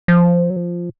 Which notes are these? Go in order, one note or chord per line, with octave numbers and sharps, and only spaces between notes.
F3
F#3
F3